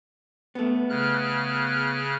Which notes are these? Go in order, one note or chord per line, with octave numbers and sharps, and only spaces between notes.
A3 B3
C#3 F6 F#6